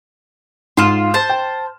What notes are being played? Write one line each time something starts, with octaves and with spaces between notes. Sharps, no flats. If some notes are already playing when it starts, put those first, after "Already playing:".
G#2 F4 C6 F6 E7
C5 A5
G5